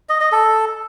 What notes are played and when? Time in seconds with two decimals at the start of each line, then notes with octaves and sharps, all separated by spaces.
0.09 D#5
0.21 D#5
0.32 A4